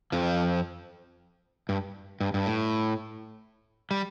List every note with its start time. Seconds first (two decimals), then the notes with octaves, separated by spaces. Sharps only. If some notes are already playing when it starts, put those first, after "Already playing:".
0.12 F2 F3
1.69 G2
2.21 G2
2.34 G2
2.46 A2
3.91 G3